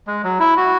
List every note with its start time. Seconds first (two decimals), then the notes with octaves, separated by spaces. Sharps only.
0.07 G#3
0.24 F#3
0.40 E4
0.57 F#4